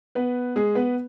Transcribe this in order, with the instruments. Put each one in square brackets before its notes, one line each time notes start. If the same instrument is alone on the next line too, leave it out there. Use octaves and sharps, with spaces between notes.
[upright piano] B3 B4
G#3 G#4
B3 B4